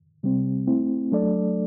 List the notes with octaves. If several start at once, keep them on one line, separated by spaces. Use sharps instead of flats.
C3 G3 C4
A3 C4 E4
F#3 A3 D4 A4 D5